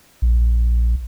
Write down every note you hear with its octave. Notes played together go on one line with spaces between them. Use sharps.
A#1